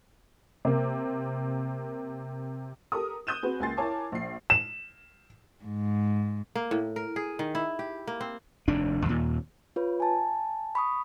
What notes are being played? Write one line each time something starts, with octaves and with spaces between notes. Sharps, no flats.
C3 A#3
G4 A4 A#4 D#6
D#6 F#6 G6 D#7 E7
C4 F#4 G#4 B4
C#2 A#3 G#5 C6 A6 C7
E4 A#4 C#5 G#5 A5 D6
A#1 C7
E7
G#2
A#3
A2
A#4
G#4
D#3
E4
G4
A#3
C4
F1 D#2 D4
D#2 A#2
F4 B4 C#5
G#5 A5
B5 C#6 D#6